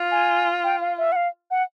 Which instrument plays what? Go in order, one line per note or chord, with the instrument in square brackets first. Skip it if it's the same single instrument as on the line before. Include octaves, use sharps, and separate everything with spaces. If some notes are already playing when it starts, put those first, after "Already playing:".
Already playing: [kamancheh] F4
[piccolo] G#5
G5
F5
E5
F#5
F5
F#5